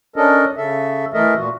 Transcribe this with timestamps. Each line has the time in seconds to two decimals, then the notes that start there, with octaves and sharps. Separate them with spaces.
0.16 C#4 D4 A4 A#4 D#5
0.57 C#3 A4 E5
1.14 E3 A3 A4 A#4 D#5 E5
1.37 A#2 F#4